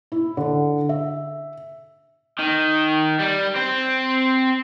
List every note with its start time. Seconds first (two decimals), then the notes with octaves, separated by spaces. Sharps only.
0.12 E4
0.37 D3
0.89 E5
2.39 D#3
3.19 G3
3.55 C4